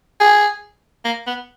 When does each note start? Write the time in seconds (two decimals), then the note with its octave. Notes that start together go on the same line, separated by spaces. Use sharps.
0.20 G#4
1.05 A#3
1.27 B3